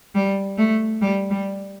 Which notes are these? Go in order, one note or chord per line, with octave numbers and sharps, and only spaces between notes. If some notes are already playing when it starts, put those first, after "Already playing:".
G3
A3
G3
G3